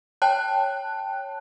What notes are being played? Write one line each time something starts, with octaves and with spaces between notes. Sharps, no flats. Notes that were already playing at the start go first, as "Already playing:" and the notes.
C#5 G5 A5 F#6